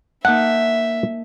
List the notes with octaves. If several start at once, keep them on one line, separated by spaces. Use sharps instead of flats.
A#3 D#4 E5 F#5 A5